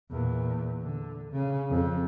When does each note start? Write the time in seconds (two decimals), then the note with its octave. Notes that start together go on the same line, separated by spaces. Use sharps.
0.11 E2 A#2
0.82 D3
1.32 C#3
1.70 F2